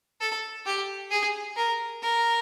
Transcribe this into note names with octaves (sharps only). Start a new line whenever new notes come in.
A4
G4
G#4
A#4
A#4